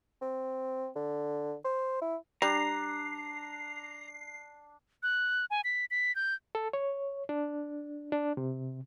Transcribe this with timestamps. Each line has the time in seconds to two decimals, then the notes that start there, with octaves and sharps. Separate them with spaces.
0.22 C4
0.95 D3
1.65 C5
2.01 E4
2.42 G3 D4 A#5 C7
5.03 F#6
5.50 G#5
5.64 B6
5.91 B6
6.15 G6
6.55 A4
6.73 C#5
7.29 D4
8.12 D4
8.37 C3